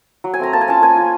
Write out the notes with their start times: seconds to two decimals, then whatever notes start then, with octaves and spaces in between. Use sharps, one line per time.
0.24 F#3
0.34 G#5
0.39 A3 C4 A#5
0.53 A#3 A5
0.61 G#5
0.68 C#4 F4 A5
0.82 A#3 G#5
0.97 C#4 F4